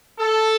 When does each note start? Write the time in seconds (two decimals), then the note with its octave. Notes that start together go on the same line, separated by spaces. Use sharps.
0.18 A4